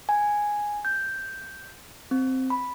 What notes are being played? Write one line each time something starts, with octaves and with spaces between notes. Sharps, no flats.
G#5
G6
C4
B5